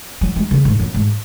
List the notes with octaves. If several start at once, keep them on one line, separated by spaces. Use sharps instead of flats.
F#3
G#3
C#3
G#2
F#2
G#2